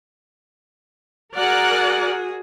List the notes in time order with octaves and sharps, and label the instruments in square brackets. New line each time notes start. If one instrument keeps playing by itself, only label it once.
[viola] F#4 G#4 [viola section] A#4 D5 F#5